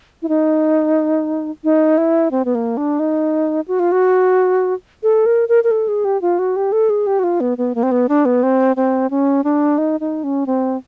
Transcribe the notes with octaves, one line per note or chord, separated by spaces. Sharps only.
E4
D#4
D#4
E4
C4
B3
A#3
D4
D#4
F#4
F4
F#4
A4
A#4
A#4
A#4
A4
G#4
G4
F4
F#4
G4
A4
G#4
G4
F#4
F4
B3
B3
A#3
C4
B3
D4
B3
C4
C4
C#4
D4
D#4
D#4
C#4
C4